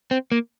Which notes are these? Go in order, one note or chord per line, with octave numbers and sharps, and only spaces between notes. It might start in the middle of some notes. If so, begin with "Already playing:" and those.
C4
A#3